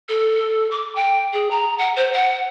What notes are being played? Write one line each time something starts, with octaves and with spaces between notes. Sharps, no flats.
A4
D6
G5
G#4
A#5
F#5
C5
F#5